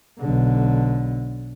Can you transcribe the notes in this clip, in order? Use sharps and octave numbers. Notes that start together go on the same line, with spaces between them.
B1 D3